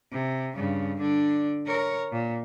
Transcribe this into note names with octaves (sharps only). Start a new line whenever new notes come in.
C3
G2 C#3
D3 D4
A#4 C#5
A#2